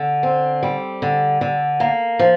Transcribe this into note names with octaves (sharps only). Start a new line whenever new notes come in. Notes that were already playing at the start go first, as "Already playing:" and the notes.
Already playing: D3
C4
G3
D3
D3
A#3
F3